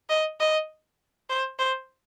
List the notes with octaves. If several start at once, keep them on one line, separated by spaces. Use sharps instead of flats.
D#5
D#5
C5
C5